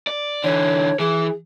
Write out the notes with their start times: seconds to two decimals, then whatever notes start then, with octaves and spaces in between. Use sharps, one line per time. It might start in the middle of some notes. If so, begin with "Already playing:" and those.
0.07 D5
0.44 D3 E3 C#5
1.00 E3 G#4